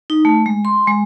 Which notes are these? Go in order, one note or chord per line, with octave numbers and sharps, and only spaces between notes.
D#4
A3
G#3
C6
G#3